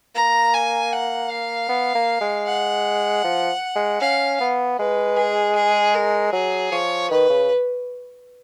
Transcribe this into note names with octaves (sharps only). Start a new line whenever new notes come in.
A#3 A#5
G#5
F#5
F5
B3
A#3
G#3
F#5
F3
G#3
C#4 F5
B3
G#3 B4
G#4
G#4
A#4
F#3 G#4
F3 C#5
D#3 B4
C#3